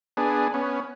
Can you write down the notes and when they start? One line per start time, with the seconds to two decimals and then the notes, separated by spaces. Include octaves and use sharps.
0.17 B3 D4 G#4
0.54 B3 C#4